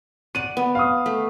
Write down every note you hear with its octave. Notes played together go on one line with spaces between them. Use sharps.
D5 F#5 D#7
B3
F5 D#6
A3